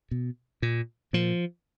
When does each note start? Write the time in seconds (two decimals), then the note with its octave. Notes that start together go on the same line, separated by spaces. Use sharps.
0.11 B2
0.62 A#2
1.13 A#2 F3